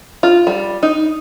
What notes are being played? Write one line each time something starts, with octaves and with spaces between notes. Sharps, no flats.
F4
G3
D#4